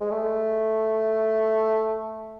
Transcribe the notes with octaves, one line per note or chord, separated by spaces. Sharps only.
G#3
A3